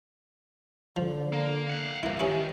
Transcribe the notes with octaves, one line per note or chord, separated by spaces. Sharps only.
D3 F3
A#3
F5 F#5
C2 A#3 E4
D#3 C#4 E4 G4 B4